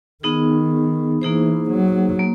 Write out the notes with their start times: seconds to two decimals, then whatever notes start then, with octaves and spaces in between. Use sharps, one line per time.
0.23 D#3 B3 D#4 G#4
1.22 E3 A#3 D#4 G#4 C5
1.70 F#3
2.19 A#3